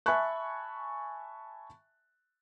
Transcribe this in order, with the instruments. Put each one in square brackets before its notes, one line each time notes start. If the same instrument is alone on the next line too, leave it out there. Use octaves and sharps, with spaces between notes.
[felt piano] E5 G#5 A5 B5 C#6 F#6